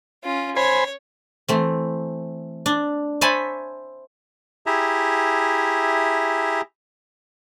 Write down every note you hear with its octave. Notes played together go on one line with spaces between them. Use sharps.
C#4 F4
C5 C#5 G#5 B5
E3 A3 C4
D4
C5 C#5 E5 G#5 A5 B5
E4 G4 G#4 E5 A#5